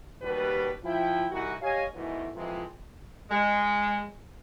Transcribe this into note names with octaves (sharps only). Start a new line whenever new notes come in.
D#2 B2 G3 B4
F3 E4 G5
C2 E3 D#4 F#4
G4 C#5 D#5 F5 G#5
E2 G#2 B2 D#3 E3 A3
F2 C3 E3 F3 G#3
G#3